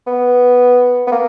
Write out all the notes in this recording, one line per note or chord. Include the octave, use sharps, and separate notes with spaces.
B3
B3
A#3